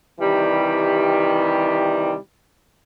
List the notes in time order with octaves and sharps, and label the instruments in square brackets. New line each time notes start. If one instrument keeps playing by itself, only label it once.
[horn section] C3 D#3 E3 G3